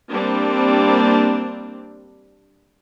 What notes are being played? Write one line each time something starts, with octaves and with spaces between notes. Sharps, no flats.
G3 A#3 C4 D4